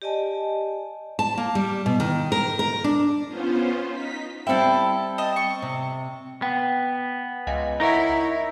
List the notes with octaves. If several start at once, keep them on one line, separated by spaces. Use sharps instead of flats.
G4 D5 D#5 G#5 A5
A5
A#3
G3
B2
D#3
A#4
A#4
D4
B3 C#4 F4 C5
D#4 B6
G3 C4 E4 A4 G5
D#5 A5
C#6
C3
B3 G5
C#2 D#5 F5 G#5
D#4 E4 A#4 C#5 E5 F#5